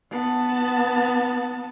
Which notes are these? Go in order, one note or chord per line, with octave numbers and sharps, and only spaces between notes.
B3 A5